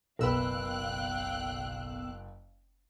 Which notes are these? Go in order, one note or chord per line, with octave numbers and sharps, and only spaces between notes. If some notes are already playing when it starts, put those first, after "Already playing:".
F#1 B1 A#4 B4 F5 G5 E6 F#6